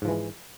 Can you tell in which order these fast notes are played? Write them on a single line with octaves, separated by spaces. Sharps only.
G#2 F3 E3 G#3